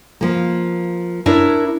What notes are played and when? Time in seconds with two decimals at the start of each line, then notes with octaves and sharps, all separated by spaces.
0.21 F3 A#3
1.26 D4 E4 A#4 C#5 E5